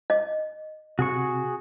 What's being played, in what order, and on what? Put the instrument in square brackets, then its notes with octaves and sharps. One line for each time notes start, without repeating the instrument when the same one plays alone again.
[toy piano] D#5
[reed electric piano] C3 [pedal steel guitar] F#4 G#4 C#6